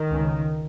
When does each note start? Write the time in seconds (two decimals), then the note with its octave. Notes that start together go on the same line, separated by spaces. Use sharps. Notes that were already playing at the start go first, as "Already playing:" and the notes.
Already playing: D#3
0.11 C#2 C#3